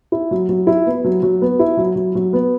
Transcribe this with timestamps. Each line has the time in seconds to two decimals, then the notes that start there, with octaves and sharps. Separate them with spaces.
0.12 E4
0.31 F#3
0.49 F#3
0.67 E4
0.86 B3
1.05 F#3
1.23 F#3
1.41 B3
1.59 E4
1.77 F#3
1.96 F#3
2.15 F#3
2.33 B3